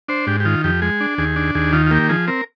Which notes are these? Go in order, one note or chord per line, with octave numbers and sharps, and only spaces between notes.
D4 C5
G#2 G4
G4
D#3 F4
F2 G4
G#3 G#4
D4
D#2 G#4
D4
D#2 G#4
D#3 F4
F4
A#3 G4
F3 G#4
C4 A#4